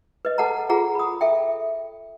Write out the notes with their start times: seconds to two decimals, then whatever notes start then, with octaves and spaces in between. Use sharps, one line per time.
0.25 B4 D#5
0.38 A4 B4 F#5 A5 A#5
0.69 F4 G#4 F#5 A#5
0.95 B5 D#6
1.21 A4 E5 G5